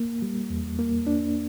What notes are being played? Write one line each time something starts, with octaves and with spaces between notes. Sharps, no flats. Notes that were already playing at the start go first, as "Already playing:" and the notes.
Already playing: A#3
G3
E2
A#3
D4